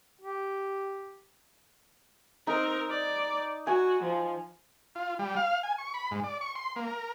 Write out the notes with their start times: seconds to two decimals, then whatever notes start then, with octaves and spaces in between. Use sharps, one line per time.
0.21 G4
2.47 C4 D#4 A#4
2.90 D5
3.67 F#4 G#5
4.03 F3
4.95 F4
5.19 G3
5.36 F5
5.63 G#5
5.78 C#6
5.94 B5
6.11 G#2
6.24 D5
6.41 C#6
6.55 C6
6.76 A#3
6.87 A#4